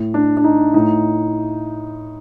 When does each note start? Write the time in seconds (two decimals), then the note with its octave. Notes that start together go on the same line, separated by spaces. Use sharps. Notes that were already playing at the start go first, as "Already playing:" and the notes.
Already playing: A2
0.14 D4
0.37 D4
0.44 D#4
0.74 A2 D#4